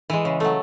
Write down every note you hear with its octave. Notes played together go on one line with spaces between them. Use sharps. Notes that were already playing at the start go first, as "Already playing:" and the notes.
E3 G#3
C#3
F#3 A3